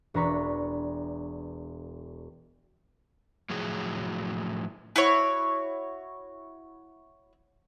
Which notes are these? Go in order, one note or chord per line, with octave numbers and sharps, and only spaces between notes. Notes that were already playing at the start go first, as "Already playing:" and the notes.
E1 D4 B4 A#5 C#6 B6
A2 F3 F#3 F#4 G#4
E4 F#4 C#5